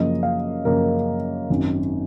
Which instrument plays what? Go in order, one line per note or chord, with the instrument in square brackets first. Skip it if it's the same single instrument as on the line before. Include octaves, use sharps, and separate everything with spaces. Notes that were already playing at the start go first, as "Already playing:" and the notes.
Already playing: [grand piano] F#2 C#3 F3 A#3 D#5
F5
F#2 C#3 F3 A#3 A#4
G#1 F#2 D#3